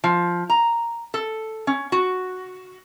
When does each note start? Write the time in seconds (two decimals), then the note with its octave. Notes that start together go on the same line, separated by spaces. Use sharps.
0.04 F3
0.50 A#5
1.14 A4
1.67 C#4
1.92 F#4